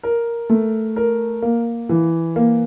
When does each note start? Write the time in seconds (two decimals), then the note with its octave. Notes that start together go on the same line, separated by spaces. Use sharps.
0.03 A#4
0.50 A3
0.96 A#4
1.42 A#3
1.89 E3
2.36 A#3